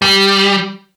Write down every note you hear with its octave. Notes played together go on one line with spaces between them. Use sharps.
G3